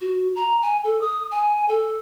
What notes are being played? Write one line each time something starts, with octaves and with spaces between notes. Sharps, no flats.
F#4
A#5
G#5
A4
D#6
G#5
A4